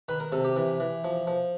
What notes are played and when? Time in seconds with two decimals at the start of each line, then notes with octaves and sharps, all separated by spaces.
0.09 D#3 B4
0.20 A#4
0.32 C3 A4
0.44 G4
0.56 E3
0.80 E3
1.04 F3
1.27 F3